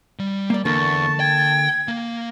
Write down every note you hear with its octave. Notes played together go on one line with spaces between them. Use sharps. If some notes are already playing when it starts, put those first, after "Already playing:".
G3
A#3 D5
E2 D3 A#3 A#4 A5 C#6
G5 G#6
A#3